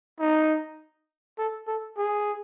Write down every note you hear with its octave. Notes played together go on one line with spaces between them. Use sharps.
D#4
A4
A4
G#4